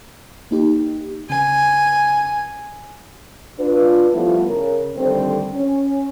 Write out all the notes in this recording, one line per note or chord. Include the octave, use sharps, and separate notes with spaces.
A#3 D#4 G4
C#3 G#5
D4 F4 B4
F3 G3 A3 B3 E4 F4
C#3 A#4 C#5
D3 D#3 G3 A3 C4
C#4